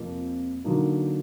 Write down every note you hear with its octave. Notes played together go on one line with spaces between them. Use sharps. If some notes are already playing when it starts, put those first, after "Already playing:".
Already playing: F2 C3 F3 A#3
D3 F#3 A#3 D#4